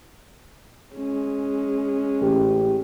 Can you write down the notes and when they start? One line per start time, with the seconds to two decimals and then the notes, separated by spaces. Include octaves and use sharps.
0.95 G#3 C#4
2.21 A1 G4